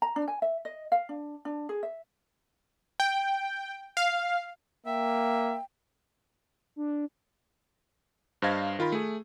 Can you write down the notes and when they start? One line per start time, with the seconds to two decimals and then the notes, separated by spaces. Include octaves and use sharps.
0.02 A#5
0.16 D4
0.28 G#5
0.42 E5
0.65 D#5
0.92 F5
1.09 D4
1.45 D4
1.69 G#4
1.83 E5
3.00 G5
3.97 F5
4.86 A#3 E5 G5
6.76 D4
8.42 G2 C5 D#5 F5 G#6 A#6
8.79 D#3 F4 A#4 B5
8.92 A3 G#4